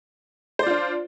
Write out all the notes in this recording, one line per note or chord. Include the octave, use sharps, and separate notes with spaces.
D4 F4 C5 D5